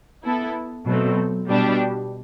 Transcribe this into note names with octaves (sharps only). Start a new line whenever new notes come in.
B3 E4 A4
B2 F#3 A3 C4
B2 G3 D4 G4